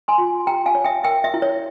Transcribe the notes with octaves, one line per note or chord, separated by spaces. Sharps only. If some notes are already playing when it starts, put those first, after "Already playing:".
G#5 C6
F4
G4 G5 A#5
F5 G#5
C#5
E5 G5
A#4 E5 G5
E5
E4
C#5